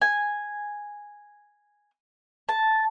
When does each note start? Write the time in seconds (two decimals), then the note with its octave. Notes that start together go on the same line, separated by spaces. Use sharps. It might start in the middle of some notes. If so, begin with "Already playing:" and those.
0.02 G#5
2.49 A5